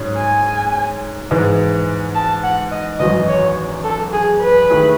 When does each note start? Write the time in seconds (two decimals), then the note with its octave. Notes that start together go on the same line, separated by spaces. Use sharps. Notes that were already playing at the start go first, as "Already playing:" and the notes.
Already playing: G#2 F#3 C#4 G#4
0.18 G#5
1.31 G#2 E3 G#3
2.15 A5
2.44 F#5
2.72 D#5
3.00 G#1 F#2 E3 D#5
3.28 C#5
3.84 A4
4.13 G#4
4.41 B4
4.70 D#3 A3 E4 G#4